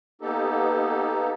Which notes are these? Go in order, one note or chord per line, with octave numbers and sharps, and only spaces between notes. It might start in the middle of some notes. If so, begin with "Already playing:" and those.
A#3 B3 D#4 G4 A4